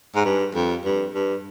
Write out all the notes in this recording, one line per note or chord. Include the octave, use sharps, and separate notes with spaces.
G#2
G2
F2
G2
G2